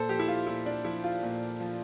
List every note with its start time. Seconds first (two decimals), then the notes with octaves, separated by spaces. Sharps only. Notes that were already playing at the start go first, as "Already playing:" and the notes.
Already playing: A#2 A4 C5
0.09 F3 G4
0.19 E4
0.28 F4
0.47 A#2 E4
0.66 D4
0.85 F3 E4
1.04 F4
1.23 A#2
1.60 F3